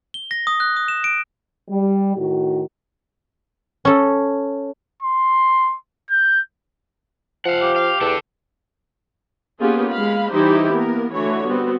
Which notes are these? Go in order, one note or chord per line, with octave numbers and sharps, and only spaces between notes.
G7
A#6
D#6
F#6
D#6
E7
D7
G3
A2 D#3 F#4
C#4 A4
C6
G6
F3 F5 F#5
G4
F5
E2 D4 A4
A#3 B3 C#4 F4 G4 G#4
G#3 F5 B5
E3 G3 D#4 E4 G4 C5
A#3 B3 A#4
D3 E3 A3 F#4 C#5
G3 B3 C4 F#4